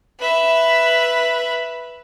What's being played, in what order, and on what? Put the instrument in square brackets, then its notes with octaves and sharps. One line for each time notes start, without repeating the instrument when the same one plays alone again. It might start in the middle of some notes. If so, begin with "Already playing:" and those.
[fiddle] B4 E5